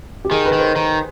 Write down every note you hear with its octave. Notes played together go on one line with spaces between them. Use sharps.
G4
D#3 G#4
B4
D#3
C5
D#3